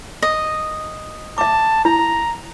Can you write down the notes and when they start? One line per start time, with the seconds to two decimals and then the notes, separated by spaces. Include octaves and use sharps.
0.22 D#5
1.38 E5 A5 D6
1.85 E4 A#5